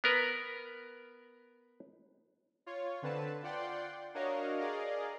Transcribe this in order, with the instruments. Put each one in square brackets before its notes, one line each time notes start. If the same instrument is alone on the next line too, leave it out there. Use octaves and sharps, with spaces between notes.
[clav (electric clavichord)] B3 A#4 B4
[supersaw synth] F4 C#5
D3 C4 B4 A5
F4 D5 F#5 G5 C6
D4 F#4 A#4 C#5 D#5 F5
G#4 A#4 D5 D#5 F5